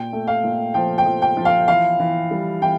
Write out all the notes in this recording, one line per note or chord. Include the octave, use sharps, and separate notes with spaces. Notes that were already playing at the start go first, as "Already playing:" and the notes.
Already playing: A#2 G5
A3
F5
A#2
F3 G5
G5
F3
G5
F3
F5
E3 F5
E3
G3
E3 G5